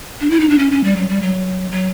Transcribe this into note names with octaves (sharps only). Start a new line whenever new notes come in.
D4
E4
D#4
D4
C#4
C#4
G3
F#3
G3
F#3
F#3